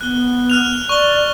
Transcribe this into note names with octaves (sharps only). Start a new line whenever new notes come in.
B3 F#6 G7
F6 F#6 F7
D5 C#6 G7